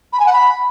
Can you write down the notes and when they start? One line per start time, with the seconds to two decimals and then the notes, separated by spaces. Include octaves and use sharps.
0.13 B5
0.20 G#5
0.26 F#5
0.33 B5